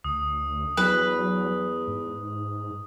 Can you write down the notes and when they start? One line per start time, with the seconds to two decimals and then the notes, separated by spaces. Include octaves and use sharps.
0.04 D2 D#6
0.77 E2 F#3 B4
1.88 G#2